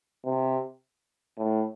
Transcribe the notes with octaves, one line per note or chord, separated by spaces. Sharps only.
C3
A2